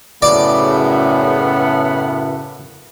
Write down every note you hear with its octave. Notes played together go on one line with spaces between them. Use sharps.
F#2 A2 C#3 B3 D5